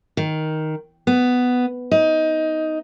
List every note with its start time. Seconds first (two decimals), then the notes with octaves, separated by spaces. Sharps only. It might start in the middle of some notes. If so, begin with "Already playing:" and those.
0.17 D#3
1.07 B3
1.91 D#4